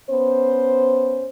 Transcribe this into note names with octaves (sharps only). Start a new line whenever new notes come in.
B3 C#4 C5